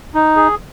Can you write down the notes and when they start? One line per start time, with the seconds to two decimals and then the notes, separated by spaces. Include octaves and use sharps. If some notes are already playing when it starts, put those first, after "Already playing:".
0.14 D#4
0.36 G#4